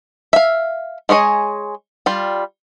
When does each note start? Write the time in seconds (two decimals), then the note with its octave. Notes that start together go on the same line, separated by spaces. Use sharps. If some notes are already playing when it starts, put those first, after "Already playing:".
0.33 E5 F5
1.09 G#3 G#4 C#5 D#5
2.06 G3 F4